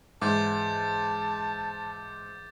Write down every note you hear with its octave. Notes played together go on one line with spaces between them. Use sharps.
G#2 E3 G#3 C#4 A5 D6 G6 A6